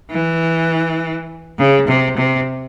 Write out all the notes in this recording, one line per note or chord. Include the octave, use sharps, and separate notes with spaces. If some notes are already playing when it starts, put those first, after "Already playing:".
E3
C#3
C3
C3